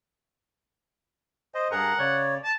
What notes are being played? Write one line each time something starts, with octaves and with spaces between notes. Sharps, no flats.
C5 D#5
G2 G#4 A#4 F#5 A#5
C#3 C#5 D5
A5